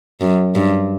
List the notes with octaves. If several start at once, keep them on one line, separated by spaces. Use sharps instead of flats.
F#2
G2